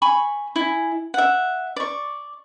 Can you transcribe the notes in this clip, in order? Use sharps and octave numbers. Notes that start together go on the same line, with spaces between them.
G#5 B5 C#6
E4 G#5
E5 F#5
D5 C#6